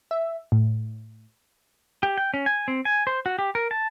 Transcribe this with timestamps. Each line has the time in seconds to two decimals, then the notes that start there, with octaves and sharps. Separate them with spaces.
0.11 E5
0.52 A2
2.03 G4
2.18 G5
2.34 C#4
2.46 G#5
2.68 C4
2.85 G#5
3.07 C5
3.26 F#4
3.39 G4
3.55 A#4
3.71 A5